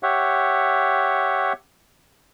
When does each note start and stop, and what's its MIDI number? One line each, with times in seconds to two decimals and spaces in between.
0.03 1.53 67
0.03 1.53 73
0.03 1.53 76
0.03 1.53 78